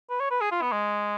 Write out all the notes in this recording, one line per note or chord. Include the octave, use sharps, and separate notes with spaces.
B4
C#5
B4
G#4
F4
B3
G#3